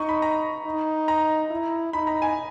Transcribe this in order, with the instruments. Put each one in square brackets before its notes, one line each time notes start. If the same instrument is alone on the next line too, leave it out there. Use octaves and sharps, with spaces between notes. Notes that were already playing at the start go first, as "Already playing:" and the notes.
Already playing: [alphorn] D#4 [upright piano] D#5 C#6
[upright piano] B5
A#5
[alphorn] D#4
[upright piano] A#5
[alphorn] E4
[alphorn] D#4 [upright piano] B5
[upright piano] A#5
G#5